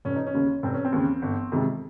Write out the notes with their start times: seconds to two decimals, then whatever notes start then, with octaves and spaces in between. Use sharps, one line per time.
0.05 F1 C#4
0.16 D#4
0.26 C#4
0.34 D#2 C#3
0.63 F1 C4
0.74 C#4
0.85 C4
0.93 D#2 C#3
1.22 G1
1.52 F2 C3 D#3 G#3